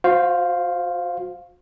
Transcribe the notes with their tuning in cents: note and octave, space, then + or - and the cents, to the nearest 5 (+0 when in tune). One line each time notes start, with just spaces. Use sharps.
F#4 -35 C5 +0 F5 +0